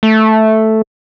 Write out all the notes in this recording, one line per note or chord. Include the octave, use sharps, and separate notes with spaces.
A3